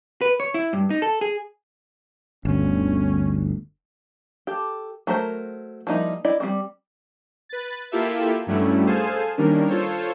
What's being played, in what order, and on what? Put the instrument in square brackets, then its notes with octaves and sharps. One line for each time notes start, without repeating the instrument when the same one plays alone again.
[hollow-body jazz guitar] B4
C#5
E4
G2
D#4
A4
G#4
[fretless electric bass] G1 D2 [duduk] C#4
[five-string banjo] G4 A4
F#3 A3 A#4 C5
F3 G3 A#3 D#4 E4
E4 D5 D#5
G3 C4 F#4
[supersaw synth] B4 A6
A#3 E4 F4 G4 A4 E5
G2 F#3 G3 A3 C#4 E4
G#4 A4 C5 F5 G#5 A5
D#3 G3 A#3 C#4 D4 A#4
F4 A4 C5 C#5